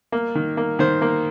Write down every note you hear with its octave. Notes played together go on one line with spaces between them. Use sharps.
A#3
D#3
A#3
D#3 C5
A#3